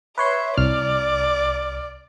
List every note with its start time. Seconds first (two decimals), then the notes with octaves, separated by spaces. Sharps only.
0.18 B4 C#5 E5 C6
0.58 C2 D5 F6